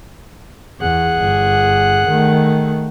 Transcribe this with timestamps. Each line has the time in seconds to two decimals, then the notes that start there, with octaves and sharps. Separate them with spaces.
0.80 E2 G#4 F#5
1.19 G1
2.07 D#3 A3